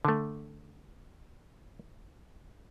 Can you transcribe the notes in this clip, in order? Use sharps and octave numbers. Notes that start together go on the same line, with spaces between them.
D3 A3